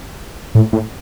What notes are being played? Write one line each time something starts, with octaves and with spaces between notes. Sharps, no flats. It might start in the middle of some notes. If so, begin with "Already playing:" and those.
A2
A2